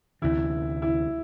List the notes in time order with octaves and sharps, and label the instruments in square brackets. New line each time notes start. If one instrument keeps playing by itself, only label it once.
[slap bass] D2 C3 E3 [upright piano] E4
[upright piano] E4